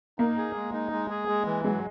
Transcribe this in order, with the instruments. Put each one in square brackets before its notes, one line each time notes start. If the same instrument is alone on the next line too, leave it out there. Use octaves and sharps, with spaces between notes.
[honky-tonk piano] A#3 [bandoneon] D#4
[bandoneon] G#4
G#3
D#4
G#3
G#4
G#3
E3
[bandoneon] F#3 [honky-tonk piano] G#3